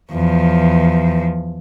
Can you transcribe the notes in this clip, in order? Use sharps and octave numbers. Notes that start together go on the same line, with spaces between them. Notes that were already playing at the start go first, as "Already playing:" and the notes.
E2 F3